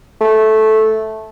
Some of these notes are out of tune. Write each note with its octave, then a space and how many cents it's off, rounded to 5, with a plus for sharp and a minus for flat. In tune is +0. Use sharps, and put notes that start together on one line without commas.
A3 -10